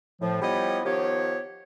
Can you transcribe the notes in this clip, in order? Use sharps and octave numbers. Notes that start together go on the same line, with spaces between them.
A2 F3
F3 G3 B3 E4 C#5 D#5
D#3 F3 B3 G4 C#5